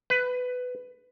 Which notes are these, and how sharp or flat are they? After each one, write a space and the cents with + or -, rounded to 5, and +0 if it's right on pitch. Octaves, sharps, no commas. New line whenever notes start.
B4 +15